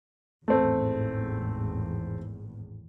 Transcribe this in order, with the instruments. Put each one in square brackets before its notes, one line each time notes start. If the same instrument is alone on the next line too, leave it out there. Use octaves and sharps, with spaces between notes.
[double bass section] G#1 E2 A2 [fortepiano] A3 C4